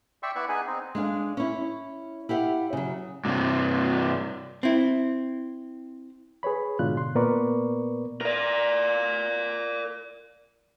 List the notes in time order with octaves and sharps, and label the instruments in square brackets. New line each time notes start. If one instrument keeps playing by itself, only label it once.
[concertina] D5 E5 G5 C6 C#6 E6
B3 E4 B4 D5 B5 C#6
B3 D#4 G#4 G#5 F#6
C4 D#4
[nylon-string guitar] G#3 D4 F5
C#4 E4
E4 G4 F5 F#5
C#3 F#3
[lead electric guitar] G2 C3
[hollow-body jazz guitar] C4 E4
[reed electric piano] G#4 B4 C#5 B5
G#2 B2 D3 D4 F4 F#6
C6
A#2 B3 A#4 B4 D5 C#6
[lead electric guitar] A#4 D5